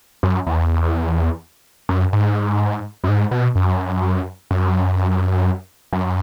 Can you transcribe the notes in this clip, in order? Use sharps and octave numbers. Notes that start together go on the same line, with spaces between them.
F#2
E2
F#2
G#2
F#2
G#2
B2
F#2
F#2
F#2